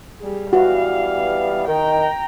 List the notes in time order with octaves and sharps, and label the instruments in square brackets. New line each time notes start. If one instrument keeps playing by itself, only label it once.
[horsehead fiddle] G3 G#4
[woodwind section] E3 G3 B3 [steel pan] F#4 [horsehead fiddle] F5
[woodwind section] D#3 [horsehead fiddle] G5 A#5